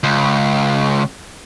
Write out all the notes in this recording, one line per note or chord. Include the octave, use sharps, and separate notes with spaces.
C#2